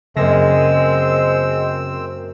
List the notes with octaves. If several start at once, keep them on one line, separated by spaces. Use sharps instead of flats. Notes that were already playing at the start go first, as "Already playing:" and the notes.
F#2 C#3 G#3 A#3 C4 E6 A#6